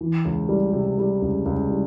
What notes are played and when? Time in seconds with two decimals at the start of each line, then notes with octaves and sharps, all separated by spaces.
0.01 E3
0.25 C#2
0.49 G3
0.73 C3
0.98 G3
1.22 C#2
1.46 C#2
1.70 G3